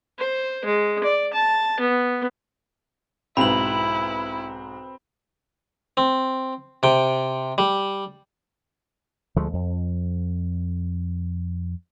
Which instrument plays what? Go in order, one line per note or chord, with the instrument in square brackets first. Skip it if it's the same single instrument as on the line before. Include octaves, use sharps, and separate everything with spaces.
[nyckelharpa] C5
G#3
D5
A5
B3
[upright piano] B1 G#2 [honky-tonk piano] C4 B4 [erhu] E4 [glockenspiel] B5 F#7
[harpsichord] C4
C3 G5
G3
[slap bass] D2 F3 G#3 A3
F2